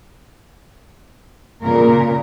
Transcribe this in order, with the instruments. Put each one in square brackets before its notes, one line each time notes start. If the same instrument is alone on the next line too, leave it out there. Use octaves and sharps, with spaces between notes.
[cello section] A#2 C#3 A#4